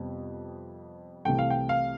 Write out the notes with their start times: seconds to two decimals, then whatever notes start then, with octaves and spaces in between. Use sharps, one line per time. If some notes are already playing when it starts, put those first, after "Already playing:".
Already playing: F2 C3 G3 B3
1.25 C2 C3 E3 A3 G5
1.39 F5
1.50 G5
1.69 F5